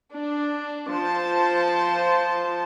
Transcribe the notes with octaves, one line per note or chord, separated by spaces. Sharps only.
D4
F3 C5 A5